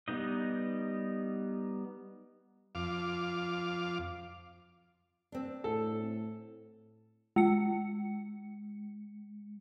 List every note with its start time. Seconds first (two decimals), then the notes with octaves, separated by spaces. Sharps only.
0.08 G3 B3 D#4 D#5
2.75 F2 F5 D6
5.32 C4 D4
5.64 A2 A4
7.36 G#3 C#7